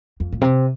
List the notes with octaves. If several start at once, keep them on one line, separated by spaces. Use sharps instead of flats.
F2
A2
C3